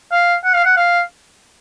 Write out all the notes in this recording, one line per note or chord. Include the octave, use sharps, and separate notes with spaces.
F5
F#5
F5
F#5
F5